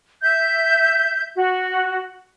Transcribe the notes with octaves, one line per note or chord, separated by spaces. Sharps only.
E5 G6
F#4